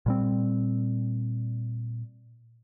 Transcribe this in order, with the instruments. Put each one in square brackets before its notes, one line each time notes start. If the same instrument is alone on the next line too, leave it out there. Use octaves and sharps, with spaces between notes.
[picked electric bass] A#2 G3 C4